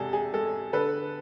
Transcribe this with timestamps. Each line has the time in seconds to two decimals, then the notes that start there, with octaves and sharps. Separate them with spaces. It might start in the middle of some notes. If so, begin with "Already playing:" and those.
Already playing: E2 C3 G#3 G#4 A4
0.13 G#4
0.33 G#3 A4
0.73 D3 A4 B4